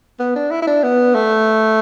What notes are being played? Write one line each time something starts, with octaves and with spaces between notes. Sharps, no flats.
B3
D4
E4
E4
D4
B3
A3